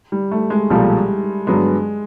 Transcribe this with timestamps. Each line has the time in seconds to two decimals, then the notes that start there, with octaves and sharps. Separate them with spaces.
0.12 G3
0.31 A3
0.50 G#3
0.70 B1 A#2 F3 G3 A3
1.47 G2 D3 F#3 G#3 B3